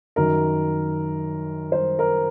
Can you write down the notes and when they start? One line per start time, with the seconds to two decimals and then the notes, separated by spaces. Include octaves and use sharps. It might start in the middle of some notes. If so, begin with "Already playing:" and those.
0.16 F#2 D#3 A#4
1.72 C5
1.99 A#4